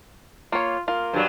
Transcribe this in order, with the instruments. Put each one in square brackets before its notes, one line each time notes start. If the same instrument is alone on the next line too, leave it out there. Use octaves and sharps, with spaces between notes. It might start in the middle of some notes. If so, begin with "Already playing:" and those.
[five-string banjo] A#3 C#5 [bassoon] F4
[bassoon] A#3 [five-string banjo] F4
[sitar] G2 F#3